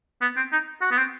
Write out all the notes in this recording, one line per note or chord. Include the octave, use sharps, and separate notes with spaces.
B3
C4
D#4
F#4
B3
C4